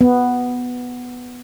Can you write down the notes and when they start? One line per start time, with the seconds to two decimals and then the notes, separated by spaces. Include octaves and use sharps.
0.01 B3